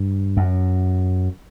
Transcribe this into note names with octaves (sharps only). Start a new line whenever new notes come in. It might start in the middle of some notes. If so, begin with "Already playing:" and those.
Already playing: G2
F#2